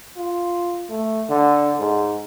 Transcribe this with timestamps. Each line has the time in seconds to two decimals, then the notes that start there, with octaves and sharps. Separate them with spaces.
0.17 F4
0.90 A3
1.29 D3
1.79 G#2